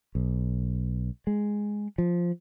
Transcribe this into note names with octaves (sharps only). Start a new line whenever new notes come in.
B1
G#3
F3